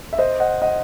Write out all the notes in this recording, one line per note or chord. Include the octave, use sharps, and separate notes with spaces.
E5
C5 D#5
D#5 F#5
D#5 F#5